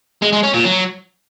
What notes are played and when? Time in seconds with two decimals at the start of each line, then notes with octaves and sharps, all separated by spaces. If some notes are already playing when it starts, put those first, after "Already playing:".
0.22 G#3
0.32 G#3
0.43 C#4
0.54 A#2
0.64 F#3